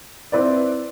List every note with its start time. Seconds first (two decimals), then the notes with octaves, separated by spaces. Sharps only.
0.32 C4 E4 B4 D5